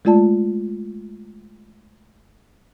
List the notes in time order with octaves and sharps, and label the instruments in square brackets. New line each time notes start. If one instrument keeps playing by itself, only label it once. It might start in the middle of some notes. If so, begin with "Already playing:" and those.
[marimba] G#3 A3 F4 D5 A5